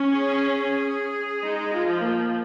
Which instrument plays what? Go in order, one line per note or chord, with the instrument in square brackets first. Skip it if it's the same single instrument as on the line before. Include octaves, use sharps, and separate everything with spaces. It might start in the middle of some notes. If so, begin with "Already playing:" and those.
Already playing: [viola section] C#4
[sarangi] G#4
[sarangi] G#3 [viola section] D#4
[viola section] F4
[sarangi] F3
[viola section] A#3